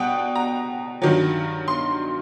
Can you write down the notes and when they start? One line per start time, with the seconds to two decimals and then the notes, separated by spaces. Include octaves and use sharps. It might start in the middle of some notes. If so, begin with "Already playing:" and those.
Already playing: B2 G3 F#5 G5
0.36 A#5
1.02 G2 D#3 F#3
1.68 C6